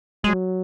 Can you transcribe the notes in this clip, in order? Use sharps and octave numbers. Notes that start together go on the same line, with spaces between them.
F#3 G#3